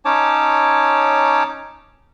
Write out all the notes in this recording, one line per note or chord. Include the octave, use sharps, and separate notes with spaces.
C#4 D#4 C#5 A5 D6